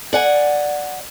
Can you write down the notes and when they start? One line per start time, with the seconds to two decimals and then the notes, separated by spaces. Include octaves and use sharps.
0.13 D5 F#5 G#5